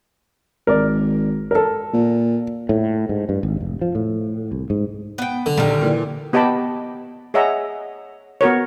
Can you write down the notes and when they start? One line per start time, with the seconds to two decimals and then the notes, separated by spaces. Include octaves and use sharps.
0.67 G#1 A#4 D5
1.51 A4 A#4
1.93 A#2
2.69 A2
3.09 G#2
3.29 G2
3.43 G#1
3.60 F1
3.81 F3
3.95 A2
4.52 C2
4.70 G#2
5.18 B3 G5
5.46 D3
5.57 A#1 D#3 G3
5.81 A#2 E3
6.33 B3 G4 D#5 G5 A5 B5
7.34 G#4 C#5 D#5 E5 F#5 A#5
8.41 B3 F#4 A#4 C#5